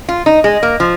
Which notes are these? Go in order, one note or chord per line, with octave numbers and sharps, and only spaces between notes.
F4
D#4
G#3
A#3
F3